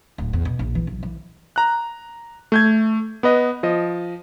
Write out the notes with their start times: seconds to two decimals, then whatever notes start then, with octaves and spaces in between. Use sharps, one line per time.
0.18 D1
0.33 E2
0.45 B2
0.59 A#1
0.75 E3
0.87 B1
1.03 E3
1.56 A#5 F#6
2.52 A3 G6 G#6
3.23 B3 B4 D#5
3.63 F3 D#5